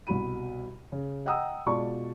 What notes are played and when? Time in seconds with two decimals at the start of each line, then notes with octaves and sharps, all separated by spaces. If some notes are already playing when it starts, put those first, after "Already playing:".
0.07 C2 B2 F#4 B5 D#7
0.92 C#3
1.26 D#5 F#5 G5 A#5 D#6 E6
1.66 B2 G#3 F4 D5 A5 C#6